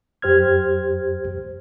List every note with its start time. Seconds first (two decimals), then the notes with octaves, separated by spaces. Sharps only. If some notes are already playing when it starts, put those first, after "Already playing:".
0.22 F#2 G4 C5 F6 G#6